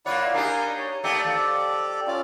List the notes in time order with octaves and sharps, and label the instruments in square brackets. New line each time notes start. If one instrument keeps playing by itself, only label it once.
[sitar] A#3 F4 C#5 [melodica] E4 D5 F#5
[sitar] D4 D#4 G4 [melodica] A#4 G#5
[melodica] C#5
[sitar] A3 A#3 D#4 [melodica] G4 A4 D5
[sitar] F2 E3
[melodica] C#4 F4 D5